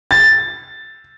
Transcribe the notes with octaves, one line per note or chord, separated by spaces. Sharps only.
A6